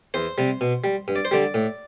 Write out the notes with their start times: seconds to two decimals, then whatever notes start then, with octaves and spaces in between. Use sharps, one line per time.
0.14 E2 C5
0.38 C3 G3
0.61 B2
0.84 G3
1.08 G2
1.16 D5
1.25 C5
1.31 D3 G3 D5
1.54 A2